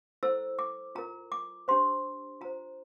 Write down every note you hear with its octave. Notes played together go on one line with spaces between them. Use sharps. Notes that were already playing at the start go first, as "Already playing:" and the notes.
E4 A4 C5 E6
D6
F4 A#4 A#5
D6
D4 G4 C5 C6
F4 C5 A#5